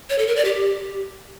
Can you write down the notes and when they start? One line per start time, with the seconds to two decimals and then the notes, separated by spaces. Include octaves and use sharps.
0.10 C#5
0.18 A4
0.27 A#4
0.36 D5
0.45 G4